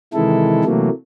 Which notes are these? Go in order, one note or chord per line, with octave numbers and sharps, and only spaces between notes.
C3 D#3 E3 G#3 E4 A4
C3 E3 F#3 A3 A#3